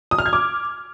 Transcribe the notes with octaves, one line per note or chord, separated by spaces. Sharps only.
D#6
F6
G#6
D6